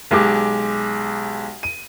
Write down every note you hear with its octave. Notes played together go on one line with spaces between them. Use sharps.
B1 G#3 G4 D6
D#7